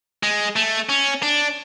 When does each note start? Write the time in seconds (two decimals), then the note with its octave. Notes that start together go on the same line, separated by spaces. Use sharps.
0.23 G#3
0.56 A3
0.89 C#4
1.23 D4